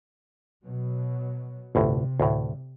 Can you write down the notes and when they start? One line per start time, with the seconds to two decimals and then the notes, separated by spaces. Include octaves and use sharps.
0.65 B2 F#3
1.75 G1 D2 A2 C3
2.20 D2 A2